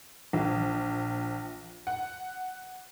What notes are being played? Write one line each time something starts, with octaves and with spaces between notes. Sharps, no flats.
A#1
F#5